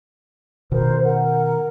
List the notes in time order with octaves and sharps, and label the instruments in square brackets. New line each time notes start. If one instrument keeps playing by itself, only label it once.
[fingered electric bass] B2 D#3 [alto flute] A#4 [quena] C5
[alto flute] A#4 [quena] F#5